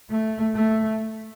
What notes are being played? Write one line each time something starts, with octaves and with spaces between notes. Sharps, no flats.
A3
A3